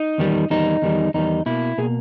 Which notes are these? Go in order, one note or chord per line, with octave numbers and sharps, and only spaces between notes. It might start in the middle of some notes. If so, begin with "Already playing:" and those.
Already playing: D#4
E2 D#3 G3
E2 D#3 G3 D#4
E2 D#3 G3
E2 D#3 G3 D#4
B2 A#3 E4
B2 A#3 G#4